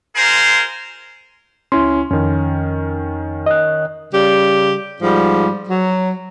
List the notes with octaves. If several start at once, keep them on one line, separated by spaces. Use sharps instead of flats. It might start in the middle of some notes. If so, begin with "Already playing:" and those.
F4 G#4 A#4 C5
C#2 C#4 E4 C6
F2 D#3 C#4
D#5 F#6
C#3 G3 G4
G#2 F3 G3
F#3